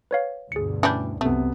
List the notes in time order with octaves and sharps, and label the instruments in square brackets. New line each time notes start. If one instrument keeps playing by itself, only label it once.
[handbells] B4 C#5 F5
[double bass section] D2 G2 B2 [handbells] G#4 C#7
[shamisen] E3 G3 D4 [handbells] C#4 B5 G6
[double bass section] C2 F#2 [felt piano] C3 B3 [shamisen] A3